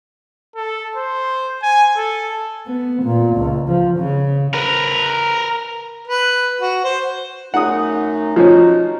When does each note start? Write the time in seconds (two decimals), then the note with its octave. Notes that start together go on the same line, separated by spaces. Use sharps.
0.55 A4
0.96 C5
1.63 G#5
1.97 A4
2.67 B3
3.03 A#2
3.36 C#2
3.69 F3
3.98 C#3
4.54 A#4 B4
6.08 B4
6.61 F#4
6.84 C5
7.54 F#2 A3 D#4 F#5 D#6
8.36 F3 C#4 D#4 F#4